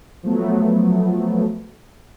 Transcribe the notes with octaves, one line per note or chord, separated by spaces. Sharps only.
F3 F#3 A3 B3